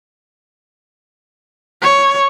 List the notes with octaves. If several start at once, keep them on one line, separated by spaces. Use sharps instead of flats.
C#5